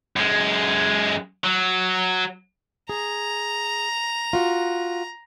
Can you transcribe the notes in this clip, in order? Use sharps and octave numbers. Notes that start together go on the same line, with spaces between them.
F#2 G#3
F#3
G#4 A#5
F4 F#4